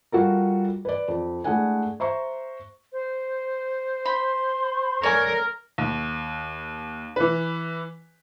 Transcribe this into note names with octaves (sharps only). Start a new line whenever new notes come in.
G3 F4 F#4 A4 A#4
B4 D5
F2
G#3 A3 D4 E4 F#5 G#5
C5 E5 A#5 C#6
C5
B5 C6
A4 A#4 C#5 D5 G#5
D#2
E3 B4